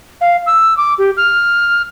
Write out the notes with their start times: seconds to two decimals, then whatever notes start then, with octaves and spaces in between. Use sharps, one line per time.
0.21 F5
0.46 E6
0.77 D6
0.98 G4
1.17 F6